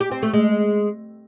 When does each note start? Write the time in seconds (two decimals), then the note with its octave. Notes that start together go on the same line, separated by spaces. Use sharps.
0.01 G4
0.12 C4
0.23 A3
0.34 G#3